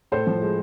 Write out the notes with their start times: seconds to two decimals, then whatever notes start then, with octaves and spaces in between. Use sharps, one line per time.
0.12 A2 A4 C5
0.27 F3
0.42 G#3